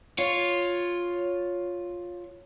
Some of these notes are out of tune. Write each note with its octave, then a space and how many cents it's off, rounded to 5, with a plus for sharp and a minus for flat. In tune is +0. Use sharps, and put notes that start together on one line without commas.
F4 +10 C#5 +0